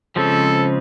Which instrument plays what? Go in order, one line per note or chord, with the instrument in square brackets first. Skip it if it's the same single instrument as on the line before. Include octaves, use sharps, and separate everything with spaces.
[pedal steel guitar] C#3 F3 G#3 C4 [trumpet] A4